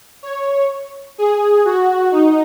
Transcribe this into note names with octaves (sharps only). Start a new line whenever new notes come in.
C#5
G#4
F#4
D#4